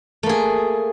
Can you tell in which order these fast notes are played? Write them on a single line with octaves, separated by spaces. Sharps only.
A3 A#3 G#4